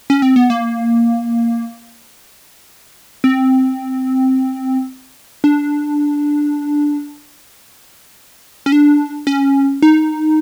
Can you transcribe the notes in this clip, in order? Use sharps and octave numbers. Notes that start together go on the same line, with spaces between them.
C#4
C4
B3
A#3
C4
D4
C#4
D4
C#4
D#4